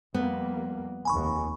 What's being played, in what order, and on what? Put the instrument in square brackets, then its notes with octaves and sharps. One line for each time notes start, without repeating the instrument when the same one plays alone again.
[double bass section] F2 G3 A#3 [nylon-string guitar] B3
[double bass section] F1 D#2 [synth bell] G#5 B5 C#6